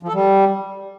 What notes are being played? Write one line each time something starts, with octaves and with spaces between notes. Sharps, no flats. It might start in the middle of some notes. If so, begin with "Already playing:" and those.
F3
A4
G3